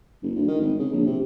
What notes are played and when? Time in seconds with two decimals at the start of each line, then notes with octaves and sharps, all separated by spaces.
0.23 F#1
0.35 D2
0.48 D#3
0.62 G#1
0.79 C#3
0.92 A#1
1.06 C3